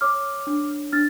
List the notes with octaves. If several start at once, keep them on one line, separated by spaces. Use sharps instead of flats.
C#5 D6 F6
D4
D4 F6 A6